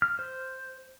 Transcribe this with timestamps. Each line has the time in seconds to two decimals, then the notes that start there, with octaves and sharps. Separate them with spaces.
0.02 F6
0.19 C5